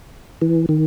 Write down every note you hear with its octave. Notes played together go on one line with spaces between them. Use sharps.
E3
D#3